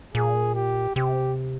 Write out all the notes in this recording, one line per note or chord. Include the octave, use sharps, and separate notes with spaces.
A#2 G#4
G4
C3 G4